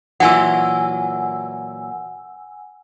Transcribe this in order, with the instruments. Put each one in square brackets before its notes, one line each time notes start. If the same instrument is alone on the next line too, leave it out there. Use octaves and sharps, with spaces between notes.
[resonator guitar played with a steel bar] A#2 E3 F#3 [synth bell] F#5 G#5 E6